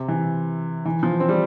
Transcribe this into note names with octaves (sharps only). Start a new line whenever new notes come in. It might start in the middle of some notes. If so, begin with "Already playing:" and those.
Already playing: C3
E3
E3
F3
C4
G3